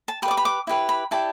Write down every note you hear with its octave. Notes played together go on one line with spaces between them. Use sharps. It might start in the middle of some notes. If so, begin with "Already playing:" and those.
A5
G4 B4 D5 B5
D6
B5
D6
E4 G4 B4
B5
E4 G4 D5 A5